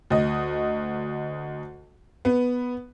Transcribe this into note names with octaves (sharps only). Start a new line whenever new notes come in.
D2 D#5
B3